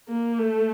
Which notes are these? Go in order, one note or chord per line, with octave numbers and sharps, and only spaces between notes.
A#3
A3